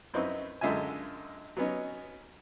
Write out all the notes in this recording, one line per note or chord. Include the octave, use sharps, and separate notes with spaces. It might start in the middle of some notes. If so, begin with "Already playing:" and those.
F#2 C4 D#4 E4 B4 C#6
F#2 D3 G#3 F4 E5 G#5
F#3 B3 C#4 D#4